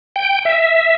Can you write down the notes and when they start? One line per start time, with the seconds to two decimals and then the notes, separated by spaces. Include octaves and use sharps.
0.16 G5
0.45 E5